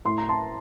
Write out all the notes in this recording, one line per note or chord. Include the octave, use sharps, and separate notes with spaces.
A2 C6
A#5
A5 C6